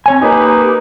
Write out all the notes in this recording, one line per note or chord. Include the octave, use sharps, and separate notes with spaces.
C4 C#5 G#5
A#3 D#4 G4 B4